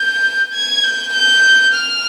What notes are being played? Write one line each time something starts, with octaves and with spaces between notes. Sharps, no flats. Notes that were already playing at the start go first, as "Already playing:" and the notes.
Already playing: G6
G#6
G6
G6
F6